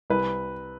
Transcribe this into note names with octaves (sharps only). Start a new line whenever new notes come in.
C2 B4